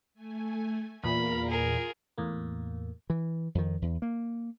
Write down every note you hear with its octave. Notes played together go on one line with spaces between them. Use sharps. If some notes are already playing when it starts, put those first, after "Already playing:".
A3 G#5
E2 A#2 A#4 F5 A#5 B5
F4 G#4 A#4
E2 A2 A#3
E3
F2 D#3
E2
A#3